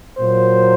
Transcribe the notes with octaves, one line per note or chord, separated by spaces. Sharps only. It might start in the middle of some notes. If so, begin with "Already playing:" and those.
A#2 F#3 A#3 C5